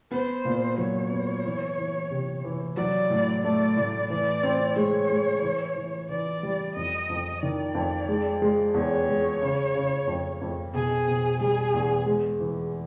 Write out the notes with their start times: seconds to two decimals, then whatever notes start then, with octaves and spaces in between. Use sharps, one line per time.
0.11 B3 C5
0.45 A#2
0.78 F#3 C#5
1.11 B3
1.45 E3
1.78 E3
2.11 C3
2.44 E3
2.77 F#3 D5
3.10 A2
3.43 A3 D5
3.77 A2
4.10 E3 D5
4.43 C4
4.76 G#3 C#5
5.10 G#3
5.42 E3
5.76 E3
6.09 E3 D5
6.43 G3
6.76 F2 D#5
7.10 F2
7.42 D#3 D5
7.75 F2
8.09 G#3
8.42 G#3
8.74 E2 C#5
9.08 G#3
9.42 C#3
9.75 C#3
10.07 F2
10.41 F2
10.74 B2 G#4
11.08 B2
11.41 G3 G#4
11.74 E2
12.06 G#3
12.40 E3